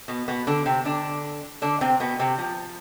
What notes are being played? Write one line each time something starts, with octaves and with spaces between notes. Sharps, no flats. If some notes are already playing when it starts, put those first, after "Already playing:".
B2 B3
B2 B3
D3 D4
C3 C4
D3 D4
D3 D4
C3 C4
B2 B3
C3 C4
F3